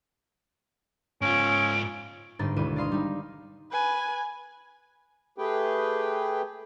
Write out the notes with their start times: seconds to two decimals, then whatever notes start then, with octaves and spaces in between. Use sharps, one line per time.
1.22 G#2 C#4 F4 D7
2.39 G1 G#2 D#4 A6
2.56 G#1 D2 B2 E4 D#7
2.76 D5 D#5 F5 C6 D#6
2.91 G3 D#4
3.72 B4 G#5
5.38 A3 G4 G#4 B4 G5